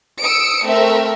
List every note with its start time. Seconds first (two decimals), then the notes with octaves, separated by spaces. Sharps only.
0.22 D#6 E6 C#7 D7
0.67 A3 C4 A#4 E5